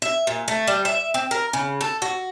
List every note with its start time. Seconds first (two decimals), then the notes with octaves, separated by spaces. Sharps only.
0.02 E5
0.27 A#2
0.48 A3
0.67 G3
0.85 E5
1.14 C4
1.31 A#4
1.53 C#3
1.81 A4
2.02 F#4